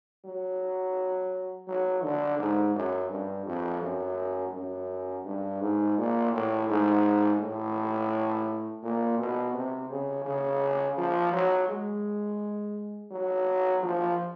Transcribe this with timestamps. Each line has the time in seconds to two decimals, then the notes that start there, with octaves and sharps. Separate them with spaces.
0.25 F#3
1.68 F#3
2.03 D3
2.39 G#2
2.75 F#2
3.10 G2
3.46 F2
3.82 F#2
4.54 F#2
5.25 G2
5.61 G#2
5.97 A#2
6.32 A2
6.69 G#2
7.40 A2
8.83 A#2
9.18 B2
9.54 C3
9.90 C#3
10.25 C#3
10.97 F3
11.33 F#3
11.69 G#3
13.11 F#3
13.83 F3